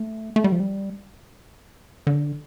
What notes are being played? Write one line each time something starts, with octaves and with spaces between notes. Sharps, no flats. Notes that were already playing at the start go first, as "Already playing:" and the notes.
Already playing: A3
A3
G3
F3
G3
D3